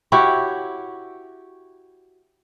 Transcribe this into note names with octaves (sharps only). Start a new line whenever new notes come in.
E4 F#4 G4 C#5